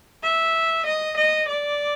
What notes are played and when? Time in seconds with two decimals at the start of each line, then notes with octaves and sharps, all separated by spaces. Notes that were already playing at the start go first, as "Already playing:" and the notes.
0.23 E5
0.86 D#5
1.17 D#5
1.48 D5